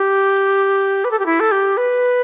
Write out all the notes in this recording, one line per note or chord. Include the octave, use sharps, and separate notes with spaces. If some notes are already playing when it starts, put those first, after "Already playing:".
Already playing: G4
B4
A4
G4
E4
A4
G4
B4